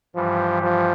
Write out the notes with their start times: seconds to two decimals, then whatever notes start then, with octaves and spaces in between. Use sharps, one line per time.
0.15 G2 E3 F3 G3
0.62 F3